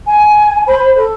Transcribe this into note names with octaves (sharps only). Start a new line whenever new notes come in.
G#5
C5 B5
A4